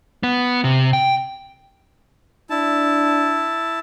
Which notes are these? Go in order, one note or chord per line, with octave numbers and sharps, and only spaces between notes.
B3
C3
G5
D4 E4 A5